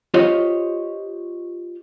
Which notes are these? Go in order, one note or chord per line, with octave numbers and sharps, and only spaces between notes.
F4 G4 C5 C#5 D#5